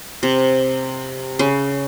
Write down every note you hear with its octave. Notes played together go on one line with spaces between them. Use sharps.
C3
C#3